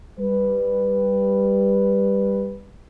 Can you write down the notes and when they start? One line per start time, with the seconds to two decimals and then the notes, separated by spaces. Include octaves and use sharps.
0.19 G3 B4